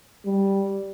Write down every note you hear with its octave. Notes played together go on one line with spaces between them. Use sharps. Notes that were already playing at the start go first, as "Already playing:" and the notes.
G3